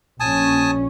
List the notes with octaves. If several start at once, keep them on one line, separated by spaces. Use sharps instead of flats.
A#1 C#4 G#5 A5 D#6